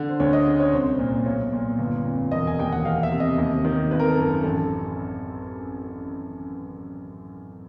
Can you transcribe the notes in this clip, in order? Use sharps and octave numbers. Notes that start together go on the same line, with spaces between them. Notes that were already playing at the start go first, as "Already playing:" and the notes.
Already playing: D3
C5
D2 C#5
D#5
C#3
C#5
C2 C5
A#2
B1 C#5
A#2
G1
F2
E1 D#5
G#5
D#2 G5
F#5
E2 F5
E5
C3
D#5
D#2
D#3
G#1 B4
A#4
A4
F#2 A#4
A1 A4